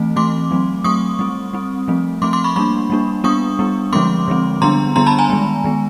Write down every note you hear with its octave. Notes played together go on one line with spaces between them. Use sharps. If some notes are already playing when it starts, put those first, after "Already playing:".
Already playing: E3 A3 C4
E3 A3 C4 C6 D6
F#3 A3 C4
F#3 A3 C4 C#6 D#6
G3 C4
G3 C4
F3 A3 C4
F3 A3 C4 C6 D6
C6 D6
B5 C#6
G3 A#3 D4 B5 C#6
G3 A#3 D4
G3 B3 D4 C#6 D#6
G3 B3 D4
D3 F3 G#3 C4 C6 D6
D3 F3 G#3 C4
D3 G3 B3 D4 A#5 C6
D3 G3 B3 D4 A#5 C6
A5 B5
G#5 A#5
D#3 G#3 B3
D#3 G#3 B3